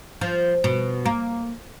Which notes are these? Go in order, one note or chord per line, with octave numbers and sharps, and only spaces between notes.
F3
B2
A#3